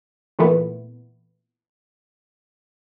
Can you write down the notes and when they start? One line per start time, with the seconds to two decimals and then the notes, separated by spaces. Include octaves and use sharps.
0.39 A#2 E3 A3 B3